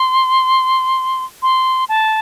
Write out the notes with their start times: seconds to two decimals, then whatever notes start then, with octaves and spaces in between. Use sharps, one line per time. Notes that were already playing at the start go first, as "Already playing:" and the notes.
Already playing: C6
1.43 C6
1.89 A5